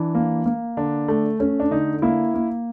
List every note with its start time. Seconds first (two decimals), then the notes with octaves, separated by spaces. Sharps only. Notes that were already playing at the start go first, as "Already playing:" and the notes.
Already playing: E3 D4
0.15 A#3
0.46 A#3
0.77 D3 D4
1.08 A3
1.40 A3 C#4
1.60 D4
1.71 D3 D#4
2.02 A#3 E4
2.34 A#3